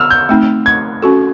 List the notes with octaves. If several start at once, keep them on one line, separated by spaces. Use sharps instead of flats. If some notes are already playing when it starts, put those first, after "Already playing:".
Already playing: D3 B3 E6 F6
G6
A3 C4 D#4
G#6
C#4 F#4 A4